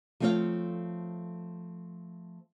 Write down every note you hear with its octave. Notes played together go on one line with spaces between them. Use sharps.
F3 A3 C4 A4 C#5 F5